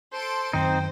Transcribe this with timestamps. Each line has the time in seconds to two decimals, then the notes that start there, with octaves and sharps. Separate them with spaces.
0.13 A4 C5 C6 D7
0.53 F#2 D#3 C4 D#4 C5 G5